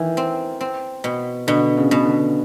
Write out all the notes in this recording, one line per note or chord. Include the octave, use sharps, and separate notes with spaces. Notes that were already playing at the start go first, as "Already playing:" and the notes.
Already playing: D#3 E3
C4
C4
B2
B2 D3
C#3
B2
D3